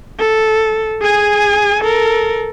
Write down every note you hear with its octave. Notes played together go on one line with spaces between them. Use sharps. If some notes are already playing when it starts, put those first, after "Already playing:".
A4
G#4 G#5
A4 A#4